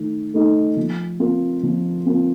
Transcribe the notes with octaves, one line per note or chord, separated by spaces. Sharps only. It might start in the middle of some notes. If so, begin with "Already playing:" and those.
Already playing: D#3 A3
A3 D#4 A4
F3
C4 F4 A#4
F3
C4 F4 A#4